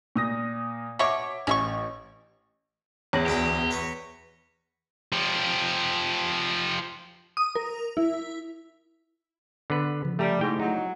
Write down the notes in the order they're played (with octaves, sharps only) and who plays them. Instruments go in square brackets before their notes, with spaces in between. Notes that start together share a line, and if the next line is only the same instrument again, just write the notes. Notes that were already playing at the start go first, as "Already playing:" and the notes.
[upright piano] A#2 D#6 A#6
[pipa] B2 C#5 C#6 [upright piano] E5 D6
[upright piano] A1 [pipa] C#4 E5 C#6
[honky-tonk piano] E2 [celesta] C#5 A#6 F#7
[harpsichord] D2 E4 G#4 [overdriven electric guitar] G4
[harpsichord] B4 A#5 C#6
[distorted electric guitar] F3 G4
[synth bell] D#6
A#4
E4
[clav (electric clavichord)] D3 B3 B4
[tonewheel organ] C#3 F3
[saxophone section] G3 [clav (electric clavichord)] A3 G4 A#5
[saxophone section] G#2 [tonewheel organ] A3 E4 [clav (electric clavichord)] G4 G5
[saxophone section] F#3 [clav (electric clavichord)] D#4